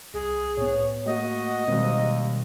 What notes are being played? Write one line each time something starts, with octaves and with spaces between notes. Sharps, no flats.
C2 G#4
A2 B3 C#5
A3 A#3 F#4 D#5
D#2 B2 D#3 G3 G#3 C4